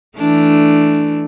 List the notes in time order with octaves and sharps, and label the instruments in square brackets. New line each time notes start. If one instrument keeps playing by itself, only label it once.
[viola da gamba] E3 A3 D4